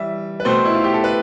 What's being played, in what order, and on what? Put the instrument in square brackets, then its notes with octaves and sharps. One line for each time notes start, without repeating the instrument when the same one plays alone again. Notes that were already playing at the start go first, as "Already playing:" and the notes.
Already playing: [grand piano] E3 G3 E5
B4
B2 A3 C4 C5
E4
F4
G4
A4
B4